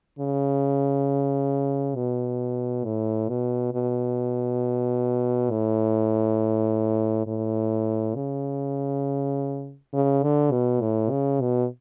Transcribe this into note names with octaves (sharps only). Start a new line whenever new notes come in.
C#3
B2
A2
B2
B2
A2
A2
C#3
C#3
D3
B2
A2
C#3
B2